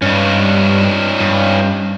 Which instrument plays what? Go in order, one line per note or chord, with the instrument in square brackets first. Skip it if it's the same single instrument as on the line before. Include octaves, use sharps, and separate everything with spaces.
[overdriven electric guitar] G2 [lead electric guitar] C#4 D#4
[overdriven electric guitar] G2